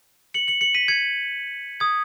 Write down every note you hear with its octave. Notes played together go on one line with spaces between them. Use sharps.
C#7 F#7
C#7 F#7
C#7 F#7
B6 D#7
G#6 C#7
D#6 G#6